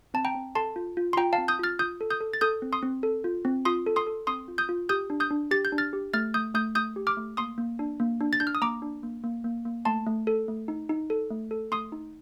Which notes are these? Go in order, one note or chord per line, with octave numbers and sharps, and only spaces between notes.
C4 A5
G5 A#5
C4
A4 A5 C6
F4
F4
C6
F4 G5 A#5
F5 A5
C4
D#6 G6
F4 F6 A6
F4 D#6 G6
A4
D#6 G6
A4
A6
A4 D#6 G6
C4
C6 D#6
C4
A4
F4
C4
F4 C6 D#6
A4
C6 D#6
A4
C4 C6 D#6
F4
D#6 G6
F4
G4 D#6 G6
D4
D#6 G6
D4
G4 A6
G6
D4
F6 A6
G4
A3 F6 A6
A3 D#6 G6
A3 D#6 G6
A3 D#6 G6
G4
D6 F6
A3
A#3 C6 D#6
A#3
D4
A#3
D4
A6
D4 G6
F6
D#6
A#3 A#5 D6
D4
A#3
A#3
A#3
A#3
A3 A5 C6
A3
A4
A3
D#4
D#4
A4
A3
A4
A3 C6 D#6
D#4